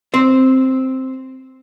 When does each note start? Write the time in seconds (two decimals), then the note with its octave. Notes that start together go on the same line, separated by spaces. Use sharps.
0.14 C4 C5